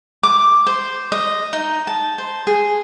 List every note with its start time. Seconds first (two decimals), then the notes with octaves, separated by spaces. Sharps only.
0.23 D6
0.67 C5
1.12 D#5
1.53 D#4
1.87 A5
2.18 C5
2.47 G#4